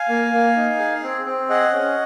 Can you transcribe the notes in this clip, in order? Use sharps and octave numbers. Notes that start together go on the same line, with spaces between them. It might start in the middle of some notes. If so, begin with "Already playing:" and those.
Already playing: F5 G#5
A#3
A#3
D#4
G#4
C4
C4
G#4 D#5 F#5
C#4